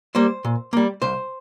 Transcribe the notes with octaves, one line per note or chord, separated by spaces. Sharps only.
G3 A#3 C5
A#2
G3 A#3
C2 C5